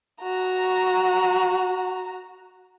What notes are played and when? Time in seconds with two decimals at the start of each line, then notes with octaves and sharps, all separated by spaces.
0.22 F#4 A#5